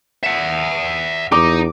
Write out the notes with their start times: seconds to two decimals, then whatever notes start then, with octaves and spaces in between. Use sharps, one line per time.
0.24 E5 F#5
1.32 E2 D#4 D6